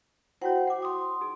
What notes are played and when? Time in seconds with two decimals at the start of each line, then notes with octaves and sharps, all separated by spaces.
0.41 E4 F#4 C5 C#5 F#5 G5
0.67 F#5 D6
0.82 C6 D6 D#6
1.21 D#4 G#4